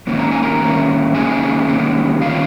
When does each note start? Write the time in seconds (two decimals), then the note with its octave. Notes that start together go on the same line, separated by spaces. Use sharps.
0.07 G#2 D#3 A#3 C#4
0.19 A#5
0.31 G#5
0.43 A#4 A#5
0.61 G#2 D#3 A#3 C#4
1.14 G#2 D#3 A#3 C#4 G#4 G#5
1.68 G#2 D#3 A#3 C#4
2.22 D#3 A#3 C#4 F4 F5